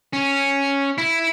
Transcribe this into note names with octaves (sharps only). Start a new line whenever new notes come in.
C#4
E4